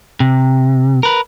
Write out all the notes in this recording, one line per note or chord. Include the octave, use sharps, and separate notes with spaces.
C3
A#4 B4